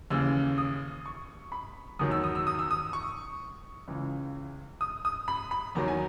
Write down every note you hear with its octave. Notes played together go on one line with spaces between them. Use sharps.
D#2 C#3 E3 E6
D#6
C#6
B5
E2 D#3 F#3 D#6
E6
D#6
E6
D#6
E6
D#6
C#6
C#2 C#3 E3
D#6
D#6
B5
B5
E2 D#3 F#3 A#5
G#5